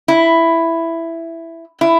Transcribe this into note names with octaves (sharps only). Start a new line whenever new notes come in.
E4
E4